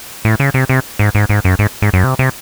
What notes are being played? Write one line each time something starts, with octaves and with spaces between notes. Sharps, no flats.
A2
C#3
C3
C3
G#2
G#2
G#2
F#2
G#2
G#2
F#2
C3
C3